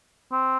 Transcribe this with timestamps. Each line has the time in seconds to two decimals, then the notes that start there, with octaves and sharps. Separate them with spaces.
0.32 C4